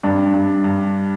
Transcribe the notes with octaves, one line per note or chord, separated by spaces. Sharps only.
G2 D4
G2
G2